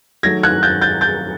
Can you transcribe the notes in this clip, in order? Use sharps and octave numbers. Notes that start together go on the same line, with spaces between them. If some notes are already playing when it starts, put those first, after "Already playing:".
D#3 F#3 A3 G#6 A#6
F#6 G#6
G6 A6
G6 A6
G6 A6